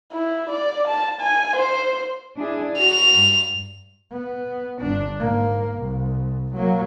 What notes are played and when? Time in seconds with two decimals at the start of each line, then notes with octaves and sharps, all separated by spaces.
0.12 E4
0.50 D5
0.88 A5
1.21 G#5
1.56 C5
2.37 D4 E4 G#4
2.78 F#4 F7
3.13 G2
4.11 B3
4.81 G1 D4
5.18 G#2 A#3
5.78 C2
6.55 F#3 A#3